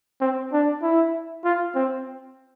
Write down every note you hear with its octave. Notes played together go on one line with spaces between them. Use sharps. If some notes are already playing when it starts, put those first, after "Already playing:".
C4
D4
E4
F4
C4